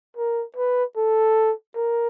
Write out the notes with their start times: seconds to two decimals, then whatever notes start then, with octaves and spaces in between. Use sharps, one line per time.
0.17 A#4
0.56 B4
0.97 A4
1.76 A#4